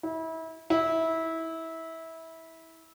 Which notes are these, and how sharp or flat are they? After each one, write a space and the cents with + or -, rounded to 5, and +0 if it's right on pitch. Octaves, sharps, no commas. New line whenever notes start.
E4 -30
E4 -20